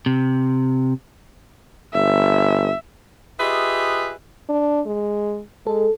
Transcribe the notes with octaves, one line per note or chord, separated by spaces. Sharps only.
C3
G1 E5
F4 G4 G#4 B4 D#5 E5
D4
G#3
G#3 A4